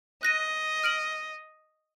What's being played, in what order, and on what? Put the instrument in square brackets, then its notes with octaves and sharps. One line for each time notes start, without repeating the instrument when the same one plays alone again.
[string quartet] D#5 [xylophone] F#6 A#6 D#7
[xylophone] F6 D7 F#7